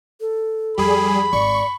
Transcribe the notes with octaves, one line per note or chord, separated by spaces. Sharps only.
A4
F2 G3 G#4 B5
G#1 D5 C#6